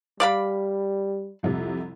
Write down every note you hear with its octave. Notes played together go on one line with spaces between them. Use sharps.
G3 D5 F5 B5
C2 F2 C3